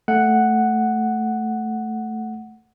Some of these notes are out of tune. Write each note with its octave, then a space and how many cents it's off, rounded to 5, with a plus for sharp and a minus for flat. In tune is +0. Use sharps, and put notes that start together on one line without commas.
A3 +0 F#5 +0